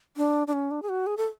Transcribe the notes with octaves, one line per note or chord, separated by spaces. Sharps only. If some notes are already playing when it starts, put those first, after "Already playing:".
D4
D4
C#4
D4
G#4
F#4
G#4
A4